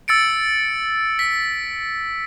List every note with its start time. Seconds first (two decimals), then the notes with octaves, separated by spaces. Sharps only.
0.08 E6 A6 C#7 D7
1.19 B6